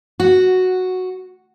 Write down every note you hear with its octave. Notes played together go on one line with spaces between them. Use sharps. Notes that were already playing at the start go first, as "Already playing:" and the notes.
F#4